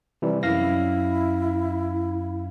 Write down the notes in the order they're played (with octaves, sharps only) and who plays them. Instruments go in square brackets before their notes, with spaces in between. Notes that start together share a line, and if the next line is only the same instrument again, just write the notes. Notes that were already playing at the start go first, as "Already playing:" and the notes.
[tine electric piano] C3 E3 G3
[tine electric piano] F#2 F5 A#6 [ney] E4